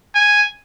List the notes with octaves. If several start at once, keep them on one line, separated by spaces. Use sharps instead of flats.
G#5